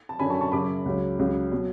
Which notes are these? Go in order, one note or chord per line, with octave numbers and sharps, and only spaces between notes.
A5
F#2 D3 F#3 G#5 B5
A5 C#6
A5 C#6
F#2 C#3 F#3 B5 D6
C#2 C#3 F#3
C#2 C#3 F#3
B2 F#3